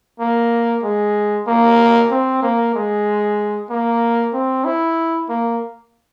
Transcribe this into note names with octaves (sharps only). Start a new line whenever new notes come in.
A#3
G#3
A#3
C4
A#3
G#3
A#3
C4
E4
A#3